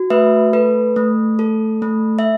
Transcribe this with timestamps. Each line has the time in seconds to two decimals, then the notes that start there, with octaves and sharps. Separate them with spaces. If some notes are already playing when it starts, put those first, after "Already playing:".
Already playing: F#4
0.10 A3 B4 E5
0.53 A4 B4
0.96 A3
1.39 A4
1.82 A3
2.19 E5